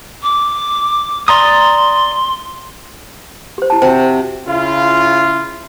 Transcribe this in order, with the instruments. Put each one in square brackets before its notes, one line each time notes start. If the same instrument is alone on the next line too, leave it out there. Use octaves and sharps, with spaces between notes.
[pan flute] D6
[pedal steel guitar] D5 A#5 D#6 [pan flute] C6
[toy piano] G4 C5
E4 A5
[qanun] C3 F#4 [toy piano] C5
[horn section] C#3 E4 F4